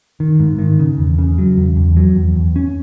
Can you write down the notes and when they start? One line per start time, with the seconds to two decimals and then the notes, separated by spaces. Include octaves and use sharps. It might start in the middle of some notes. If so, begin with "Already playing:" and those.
0.20 D#3
0.40 G#2
0.59 D#3
0.79 C#3
0.98 E2
1.19 C#3
1.38 F#3
1.57 E2
1.77 E2
1.96 F#3
2.16 E2
2.36 E2
2.56 C#4